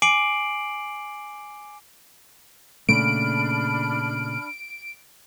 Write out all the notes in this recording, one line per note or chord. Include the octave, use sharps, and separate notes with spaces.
G#5 D6 C7 D7 F#7
A#2 C#3 A3 D4 B5 F6 D7